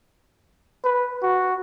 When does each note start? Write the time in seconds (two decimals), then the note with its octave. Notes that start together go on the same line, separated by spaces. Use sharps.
0.84 B4
1.22 F#4